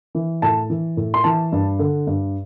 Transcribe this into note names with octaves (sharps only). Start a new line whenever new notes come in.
E3
A2 A5
E3
A2
C6
E3 A5
G2
D3
G2